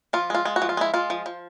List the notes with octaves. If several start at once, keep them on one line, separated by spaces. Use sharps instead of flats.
F3 F4
G#3 F4
G#3
F#4
F3
F4
G#3 E4
G#3 F4
F3
F3